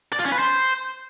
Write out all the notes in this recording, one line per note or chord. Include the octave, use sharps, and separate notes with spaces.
D5
F4
C#4
B4
C5